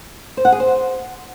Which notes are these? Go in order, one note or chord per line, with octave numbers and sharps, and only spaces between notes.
C5
F#5
G#4
C5